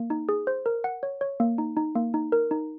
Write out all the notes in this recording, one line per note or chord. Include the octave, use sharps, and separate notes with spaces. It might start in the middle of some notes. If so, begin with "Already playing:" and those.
Already playing: A#3
D#4
G#4
C5
A#4
F#5
C#5
C#5
A#3
D#4
D#4
A#3
D#4
A#4
D#4